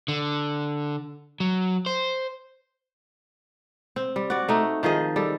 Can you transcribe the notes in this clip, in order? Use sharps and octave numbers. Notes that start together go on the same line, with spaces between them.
D3
F#3
C5
C4
G3
F#4 D5
A3 D#4
D#3 F3 G#4 D#5
G3 A4